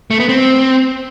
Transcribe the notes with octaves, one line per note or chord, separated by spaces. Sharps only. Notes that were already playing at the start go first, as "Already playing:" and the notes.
A3
B3
C4